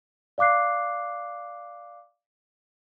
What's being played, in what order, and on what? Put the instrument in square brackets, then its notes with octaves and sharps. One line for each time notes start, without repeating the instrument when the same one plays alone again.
[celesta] D5 F5 D6 F#6 C7